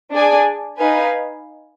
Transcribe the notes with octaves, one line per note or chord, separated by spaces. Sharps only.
D4 G#4 D5 G#5
D#4 B4 F5 G#5